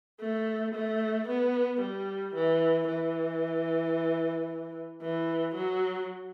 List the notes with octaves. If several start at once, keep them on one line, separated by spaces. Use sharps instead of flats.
A3
A3
B3
G3
E3
E3
E3
F#3